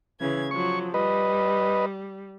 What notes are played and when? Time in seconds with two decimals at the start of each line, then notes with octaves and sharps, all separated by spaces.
0.19 C#3 E3 G#6
0.51 F3 F#3 C#6
0.94 G3 B4 D#5